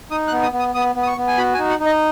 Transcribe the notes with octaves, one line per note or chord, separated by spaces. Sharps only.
D#4 D#6
F#6
B3
D#6
B3
D#6
B3 D#6
B3
D#6
C#6
B3
G#5
F#4 B5
G#5
D#4
F#5
D#4
D#5